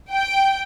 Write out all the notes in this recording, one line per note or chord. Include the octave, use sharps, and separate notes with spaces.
G5